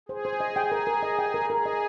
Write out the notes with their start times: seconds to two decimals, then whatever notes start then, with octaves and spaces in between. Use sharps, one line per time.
0.09 G#4 C5
0.25 C5
0.40 D#5
0.56 G5
0.72 A#4
0.87 A#4
1.03 D#5
1.19 G5
1.34 A#4
1.50 G#4 A#4
1.66 D#5